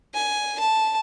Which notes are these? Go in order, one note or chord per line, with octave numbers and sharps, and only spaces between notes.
G#5
A5